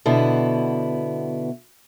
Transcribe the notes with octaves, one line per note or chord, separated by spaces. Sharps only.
B2 D3 B3 E4